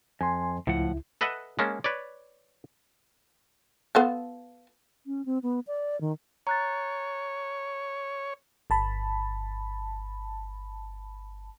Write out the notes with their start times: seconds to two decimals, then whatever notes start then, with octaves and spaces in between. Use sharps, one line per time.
0.21 F2 G#5 C6
0.67 C#2 A2 F3 E4 F#5
1.21 A4 B4 D#5 E5 F#5
1.59 G#3 A#3 C#4 A5
1.84 B4 C#5 D5
3.95 B3 F4 A4
5.07 C#4
5.26 C4
5.43 B3
5.67 D5
6.01 D#3
6.47 C#5 A#5 F#6 A6
8.70 G1 A5 B5